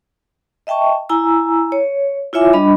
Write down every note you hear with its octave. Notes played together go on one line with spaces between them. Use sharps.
D#5 E5 G5 A5 C#6
E4 G#5 A#5 E6
C#5
E4 F4 C#5 E5 G#5 D6
G3 D4 D#5 B5